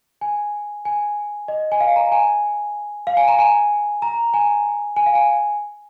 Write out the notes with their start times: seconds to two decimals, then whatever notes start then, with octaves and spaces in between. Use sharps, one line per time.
0.21 G#5
0.85 G#5
1.48 D#5
1.72 G#5
1.80 F5
1.96 A#5
2.12 G#5
3.07 F5
3.17 G#5
3.28 A#5
3.39 G#5
4.02 A#5
4.34 G#5
4.96 G#5
5.06 F5
5.15 G#5